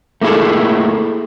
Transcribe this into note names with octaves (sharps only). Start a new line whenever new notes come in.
A3 A#3 E4 G#4 A4